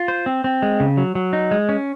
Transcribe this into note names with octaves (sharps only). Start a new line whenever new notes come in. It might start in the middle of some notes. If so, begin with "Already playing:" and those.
Already playing: F4
C5
C4
C4
G#3
C#3
F#3
F#3
D#4
G#3
C#4